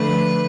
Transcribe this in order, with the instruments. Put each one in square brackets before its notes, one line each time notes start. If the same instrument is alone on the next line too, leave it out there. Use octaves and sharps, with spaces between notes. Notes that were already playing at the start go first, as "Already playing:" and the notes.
Already playing: [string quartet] D3 F3 A3 B4